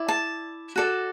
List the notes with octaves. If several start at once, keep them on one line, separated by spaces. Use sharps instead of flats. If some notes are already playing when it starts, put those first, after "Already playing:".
Already playing: E4 D5
A5
F#4 A4 D5